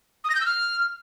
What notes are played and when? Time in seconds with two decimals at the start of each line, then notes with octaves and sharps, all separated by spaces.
0.24 D#6
0.30 A#6
0.35 G6
0.40 E6
0.46 F6